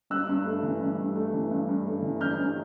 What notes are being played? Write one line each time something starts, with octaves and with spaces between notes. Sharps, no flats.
G2 E6 F#6
G2
A3
E3
G2
G2
A3
E3
G2
G2
A3
E3
G2 F6 G6
G2